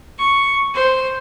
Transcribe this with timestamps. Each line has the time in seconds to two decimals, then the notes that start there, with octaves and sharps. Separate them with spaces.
0.18 C#6
0.74 C5